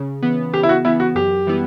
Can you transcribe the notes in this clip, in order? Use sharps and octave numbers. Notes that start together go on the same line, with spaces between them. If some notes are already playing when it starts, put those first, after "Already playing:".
Already playing: C#3
E3 B3
C#3 G4
E4
F#4
E3 B3 E4
F#4
F#2 G4
E3 G3 B3 E4